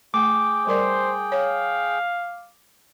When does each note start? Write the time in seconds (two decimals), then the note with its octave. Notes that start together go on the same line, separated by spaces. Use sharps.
0.14 A3 G#4 G5 D6
0.67 G3 A#4 C5 D5
1.32 C#5 F5